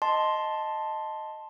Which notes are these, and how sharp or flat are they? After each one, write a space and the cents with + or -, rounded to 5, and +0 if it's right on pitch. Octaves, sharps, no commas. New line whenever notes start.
D#5 +0 A5 +0 C6 +0